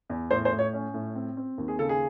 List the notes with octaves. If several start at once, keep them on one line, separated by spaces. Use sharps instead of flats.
E2
A2 C5
C5
A2
C#5
C#4
A2
C4
C4
D#2
G#4
C#3 A4
G#4